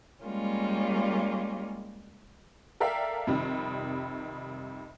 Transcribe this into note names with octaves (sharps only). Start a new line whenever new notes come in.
G3 G#3 A#3 C#4 F4
A4 A#4 D5 E5 F5 G5
F2 C3 D#3 G3